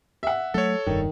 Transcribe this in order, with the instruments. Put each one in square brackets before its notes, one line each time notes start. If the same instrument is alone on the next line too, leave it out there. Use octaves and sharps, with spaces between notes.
[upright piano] E5 F#5
[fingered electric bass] F#3 A3 [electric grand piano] A4 C#5
[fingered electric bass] F1 G2 [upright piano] D#3